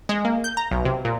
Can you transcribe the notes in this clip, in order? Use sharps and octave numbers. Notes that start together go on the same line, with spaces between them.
G#3
A#3
G6
A#5
B1
C3
A#2